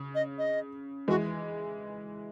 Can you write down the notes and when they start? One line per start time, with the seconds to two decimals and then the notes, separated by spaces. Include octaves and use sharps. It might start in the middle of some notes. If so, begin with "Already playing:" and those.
Already playing: C#3
0.15 D#5
0.38 D#5
1.08 E3 G#3 F#4